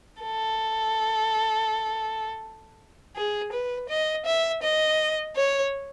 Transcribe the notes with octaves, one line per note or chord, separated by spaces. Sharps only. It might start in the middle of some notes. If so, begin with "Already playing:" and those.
A4
G#4
B4
D#5
E5
D#5
C#5